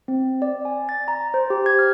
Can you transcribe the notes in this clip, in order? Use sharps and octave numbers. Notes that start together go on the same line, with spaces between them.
C4
D5
G#5
A6
A#5
C5
G4
G#6
F6